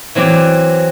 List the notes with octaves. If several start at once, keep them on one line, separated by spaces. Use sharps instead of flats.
E3 F#3 C4 D5